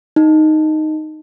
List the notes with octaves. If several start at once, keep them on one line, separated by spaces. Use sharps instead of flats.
D#4